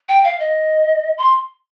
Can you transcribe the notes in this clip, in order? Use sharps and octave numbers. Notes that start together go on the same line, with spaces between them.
G5
F5
D#5
C6